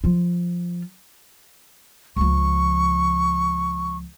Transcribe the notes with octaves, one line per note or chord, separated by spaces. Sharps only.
F3 F4
C#2 F3 C#6